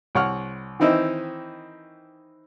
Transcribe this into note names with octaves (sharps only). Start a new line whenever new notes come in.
C2 C#5 F#5 C#6 F6
D#3 E3 C4 D#4 E4